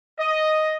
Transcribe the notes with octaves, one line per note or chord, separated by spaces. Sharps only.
D#5